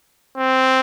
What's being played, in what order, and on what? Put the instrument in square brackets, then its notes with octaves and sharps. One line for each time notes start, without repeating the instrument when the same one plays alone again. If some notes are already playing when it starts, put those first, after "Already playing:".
[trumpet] C4